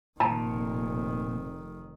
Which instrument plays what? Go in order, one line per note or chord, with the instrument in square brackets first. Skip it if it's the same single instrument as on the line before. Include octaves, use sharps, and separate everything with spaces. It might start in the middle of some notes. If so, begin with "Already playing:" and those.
[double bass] F1 D#3 [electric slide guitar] A#2 [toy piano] A5 A#5